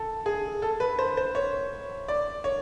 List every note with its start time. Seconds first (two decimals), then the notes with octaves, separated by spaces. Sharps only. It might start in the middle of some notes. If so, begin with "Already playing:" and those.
Already playing: A4
0.26 G#4
0.62 A4
0.80 B4
0.99 C5
1.17 C5
1.35 C#5
2.08 D5
2.44 C#5